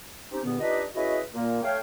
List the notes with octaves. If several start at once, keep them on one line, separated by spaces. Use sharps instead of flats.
C4 C#4 D#4 G4
E2 G2 A#2 D3 B3
D4 D#4 F4 G4 B4 D#5
C#4 E4 F#4 G#4 B4 D#5
A#2 A#3
A3 C#5 F5 G5